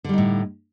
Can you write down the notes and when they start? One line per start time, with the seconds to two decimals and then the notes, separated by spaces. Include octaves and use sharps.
0.04 D3
0.09 G3
0.13 D#4
0.18 A2